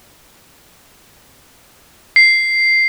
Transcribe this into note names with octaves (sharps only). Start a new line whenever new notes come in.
C7